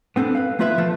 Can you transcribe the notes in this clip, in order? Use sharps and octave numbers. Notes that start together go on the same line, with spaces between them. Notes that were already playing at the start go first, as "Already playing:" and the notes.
B3 C4 D4 A4
B4 F5
A3 B3 E4 F4 B4 E5
E3 F3 A3 F4 A4